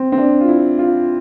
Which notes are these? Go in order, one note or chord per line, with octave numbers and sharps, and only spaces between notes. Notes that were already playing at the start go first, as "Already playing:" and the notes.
Already playing: C4
C4
D4
F4
E4
F4